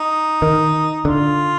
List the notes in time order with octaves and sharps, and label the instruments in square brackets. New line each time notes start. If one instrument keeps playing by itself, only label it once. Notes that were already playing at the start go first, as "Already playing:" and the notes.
Already playing: [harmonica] D#4
[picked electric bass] D#3
[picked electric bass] D3 [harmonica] F4